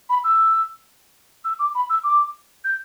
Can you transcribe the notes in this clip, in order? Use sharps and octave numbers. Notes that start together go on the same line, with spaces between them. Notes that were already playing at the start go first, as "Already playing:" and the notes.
B5
E6
E6
D6
B5
E6
D6
G6